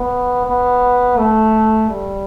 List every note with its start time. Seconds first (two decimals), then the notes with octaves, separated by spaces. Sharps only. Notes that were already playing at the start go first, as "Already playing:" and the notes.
Already playing: B3
0.45 B3
1.18 A3
1.90 G3